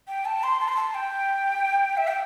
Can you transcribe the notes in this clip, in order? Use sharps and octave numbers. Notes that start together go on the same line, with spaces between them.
G5
A5
C6
A5
C6
A5
G5
E5
G5